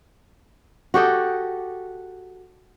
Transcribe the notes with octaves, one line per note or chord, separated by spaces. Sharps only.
F#4 G4 A4 D#5